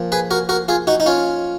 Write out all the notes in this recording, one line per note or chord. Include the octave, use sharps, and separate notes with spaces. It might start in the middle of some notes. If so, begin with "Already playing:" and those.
Already playing: A#2 F3
G#4 B4
F#4 A#4
F#4 A#4
F4 G#4
D#4 F#4
D#4
C#4 F4